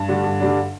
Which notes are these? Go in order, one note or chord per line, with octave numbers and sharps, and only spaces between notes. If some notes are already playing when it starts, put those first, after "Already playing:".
Already playing: G2
D3 G3 D4
G2
D3 G3 D4